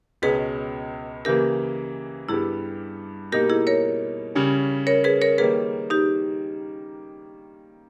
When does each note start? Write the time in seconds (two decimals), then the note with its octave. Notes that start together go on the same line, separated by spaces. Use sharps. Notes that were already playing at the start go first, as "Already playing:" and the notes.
0.22 C#2 B2 G#3 C#4 G#4 B4
1.25 C#3 E3 A#3 G4 A#4
2.29 G2 G3 B3 E4 G4 G#4
3.32 B2 G3 A#3 D#4 G4 A#4
3.50 E4 G#4
3.67 A#4 C#5
4.35 C#3 G3 C#4
4.87 A#4 C#5
5.04 G#4 B4
5.21 A#4 C#5
5.38 D#3 G3 A#3 G#4 B4
5.90 D#4 G4